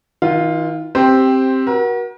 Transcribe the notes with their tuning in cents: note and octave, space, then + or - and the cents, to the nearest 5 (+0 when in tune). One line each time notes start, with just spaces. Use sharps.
D#3 +40 F4 +0 F#5 +0
C4 +10 G4 +0 C5 +0
F#4 +10 A#4 +40